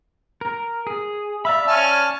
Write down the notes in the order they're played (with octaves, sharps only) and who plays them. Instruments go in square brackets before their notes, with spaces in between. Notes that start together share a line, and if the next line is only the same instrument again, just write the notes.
[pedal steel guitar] A#4
G#4
[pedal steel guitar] D5 F5 B5 [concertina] E5
[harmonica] C#4 G#5 F6 [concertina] A5